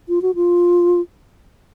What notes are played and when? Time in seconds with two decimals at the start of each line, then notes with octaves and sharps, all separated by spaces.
0.09 F4
0.22 F#4
0.35 F4